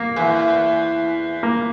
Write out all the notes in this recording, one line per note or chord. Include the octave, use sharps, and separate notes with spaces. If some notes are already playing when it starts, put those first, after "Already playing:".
Already playing: A#3
E2
A#3